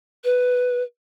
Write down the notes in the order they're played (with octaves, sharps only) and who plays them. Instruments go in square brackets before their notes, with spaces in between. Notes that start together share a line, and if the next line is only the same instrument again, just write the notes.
[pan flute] B4